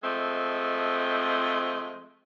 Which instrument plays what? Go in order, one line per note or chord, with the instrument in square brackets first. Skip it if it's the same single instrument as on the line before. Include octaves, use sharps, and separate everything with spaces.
[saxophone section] F3 G#3 A3 C4 D#5